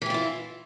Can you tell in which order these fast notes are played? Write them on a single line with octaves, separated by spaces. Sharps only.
E3 G4 F4 E4